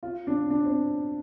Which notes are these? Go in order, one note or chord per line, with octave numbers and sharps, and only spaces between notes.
F4
D4
D4
C4